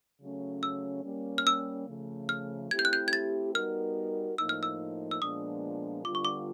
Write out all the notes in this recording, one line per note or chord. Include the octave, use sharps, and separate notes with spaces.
C#3 F#3 A3 C#4
E6
G3 A#3 C#4
F6
E6
C#3 F3 A3
F6
A3 C4 E4 G4 G#6
G6
F#6
G6
G#6
A6
G3 B3 D#4 F#4 A#4 F6
A2 F3 A#3 D#4 E6
F6
E6
E6
A#2 F3 G#3 B3 D4 D#6
D3 G3 B3 D4 F4 D6
C#6
D6